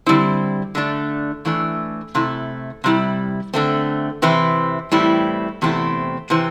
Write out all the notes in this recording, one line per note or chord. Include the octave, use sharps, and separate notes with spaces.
D3 G3 C4 E4
D3 A3 D4
A2 E3 A3 D4
C3 A3 E4
C3 G3 E4
D3 A3 C4
C3 E3 C4 E4
A2 E3 G3 C4 E4
E2 C3 A3 C4 E4
C3 E3 C4